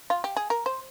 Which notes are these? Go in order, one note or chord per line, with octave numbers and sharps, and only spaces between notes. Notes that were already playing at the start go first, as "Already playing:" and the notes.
F4
G4
G#4
A#4
C5